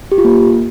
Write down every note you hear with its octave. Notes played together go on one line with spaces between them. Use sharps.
G4
F4
A#3